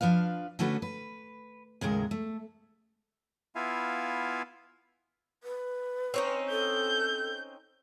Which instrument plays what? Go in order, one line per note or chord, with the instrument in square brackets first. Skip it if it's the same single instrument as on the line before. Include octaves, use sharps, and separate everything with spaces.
[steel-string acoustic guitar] F3 D4 B4 F5
D3 A3 C#4 F#4 B4
B4
D#2 A2 C#3 G#3 A#4
A3
[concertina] B3 E4 F4 E5 F5 G#5
[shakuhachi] B4
[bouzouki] C4 C#4 D#4
[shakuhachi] A4 [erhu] G6